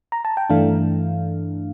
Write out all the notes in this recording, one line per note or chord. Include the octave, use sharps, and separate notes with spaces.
A#5
A5
G5
G2 E3 A3 D4 F5